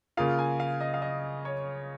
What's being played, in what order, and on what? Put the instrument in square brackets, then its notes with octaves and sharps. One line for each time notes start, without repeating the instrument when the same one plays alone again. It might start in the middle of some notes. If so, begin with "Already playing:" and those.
[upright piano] C#3 A#3 F4 G#4 [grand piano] F5
[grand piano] G#5
F5
D#5
F5
D#5
C#5